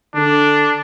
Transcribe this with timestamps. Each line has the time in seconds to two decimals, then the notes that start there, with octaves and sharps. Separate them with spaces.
0.15 D3 D4